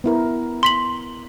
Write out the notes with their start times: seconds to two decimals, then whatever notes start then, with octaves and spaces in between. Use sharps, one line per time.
0.04 B3 E4 A#4
0.63 C6 B6 F#7